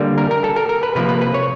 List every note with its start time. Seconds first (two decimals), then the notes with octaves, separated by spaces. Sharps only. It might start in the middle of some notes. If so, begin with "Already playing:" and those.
Already playing: D3 G3 A#3
0.18 A#4
0.31 A#4
0.44 A4
0.56 A#4
0.69 A#4
0.83 B4
0.95 C3 F3 A#3 B4
1.09 B4
1.21 B4
1.34 C#5